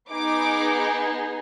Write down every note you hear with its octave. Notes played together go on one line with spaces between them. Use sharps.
B3 D#4 G#4 D6